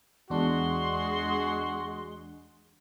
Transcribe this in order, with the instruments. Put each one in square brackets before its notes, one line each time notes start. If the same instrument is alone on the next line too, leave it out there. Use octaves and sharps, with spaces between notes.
[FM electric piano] E2 D4 [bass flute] G#3 [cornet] F#4 [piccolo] C6